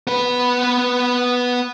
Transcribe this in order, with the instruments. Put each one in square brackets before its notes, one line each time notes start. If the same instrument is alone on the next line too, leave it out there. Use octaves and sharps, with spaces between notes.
[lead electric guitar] B3 B4